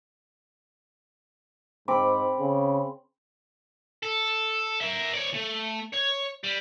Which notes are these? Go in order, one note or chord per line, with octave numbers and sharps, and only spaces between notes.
G#2 C4 B5 D6
C#3
A4
A#4 E5
C#5 D5
A3
C#5
G3